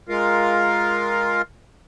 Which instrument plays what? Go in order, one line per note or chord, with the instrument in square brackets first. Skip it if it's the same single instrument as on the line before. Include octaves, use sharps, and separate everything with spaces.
[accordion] G#3 F4 A#4 F5